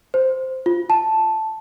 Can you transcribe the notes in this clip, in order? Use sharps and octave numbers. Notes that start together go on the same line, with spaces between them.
C5
F4
A5